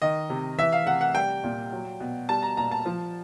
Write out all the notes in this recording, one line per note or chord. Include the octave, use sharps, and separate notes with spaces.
D#3 D#5
C3
E3 E5
F5
C3 F#5
F#5
G3 G5
A#2
F#3
B2
G3 A5
A#5
A#2 A#5
A5
F3